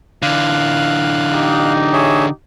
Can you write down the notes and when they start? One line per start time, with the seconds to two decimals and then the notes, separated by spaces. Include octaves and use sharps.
0.22 D3 E3 F5 F#6
1.33 D#4 G4 D#5
1.93 G#4 C#5 E5